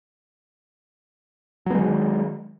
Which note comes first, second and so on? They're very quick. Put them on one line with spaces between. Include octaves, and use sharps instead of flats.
F#3 B3 G#3 D#3